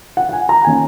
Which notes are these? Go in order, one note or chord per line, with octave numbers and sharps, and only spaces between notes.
F#5
F#5
G#5
A#5
D#3 A#3 C#4 G#5